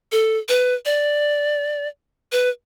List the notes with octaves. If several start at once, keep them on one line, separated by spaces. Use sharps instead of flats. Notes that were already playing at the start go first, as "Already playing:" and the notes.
A4
B4
D5
B4